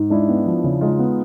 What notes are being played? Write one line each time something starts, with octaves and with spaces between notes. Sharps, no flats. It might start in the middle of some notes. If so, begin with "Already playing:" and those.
Already playing: G#2
G#3 D4 E4
B3
F3
C#3
G#3 D#4 F4
B3